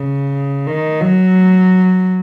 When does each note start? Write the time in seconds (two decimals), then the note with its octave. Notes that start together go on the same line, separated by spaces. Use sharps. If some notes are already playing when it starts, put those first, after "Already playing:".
Already playing: C#3
0.67 D#3
1.02 F#3